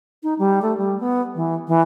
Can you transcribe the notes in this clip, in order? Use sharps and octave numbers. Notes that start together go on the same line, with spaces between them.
D#4
G3
A3
G3
B3
E3
E3